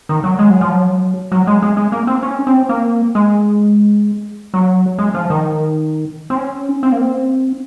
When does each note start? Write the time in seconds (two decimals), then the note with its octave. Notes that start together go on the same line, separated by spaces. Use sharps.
0.09 D#3
0.24 F#3
0.39 G#3
0.50 F#3
0.61 F3
0.72 F#3
1.32 F#3
1.47 G#3
1.62 G#3
1.77 G#3
1.92 A#3
2.07 C4
2.23 C#4
2.47 C4
2.69 A#3
3.15 G#3
4.54 F#3
4.98 G#3
5.15 F3
5.30 D#3
6.30 C4
6.37 C#4
6.83 C4
6.92 A#3
7.01 C4